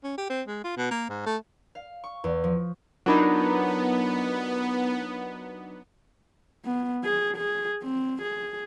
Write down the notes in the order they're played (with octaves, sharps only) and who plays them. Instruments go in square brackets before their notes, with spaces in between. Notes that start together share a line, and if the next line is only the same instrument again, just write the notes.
[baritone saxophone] C#4
G4
C4
G#3
F4
B2
A#3
G#2
A3
[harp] F5
C#6
E2
F3
[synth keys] F#3 D4 D#4 [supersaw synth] B3 [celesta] F4 A#4 B5
[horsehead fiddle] B3
G#4
G#4
C4
G#4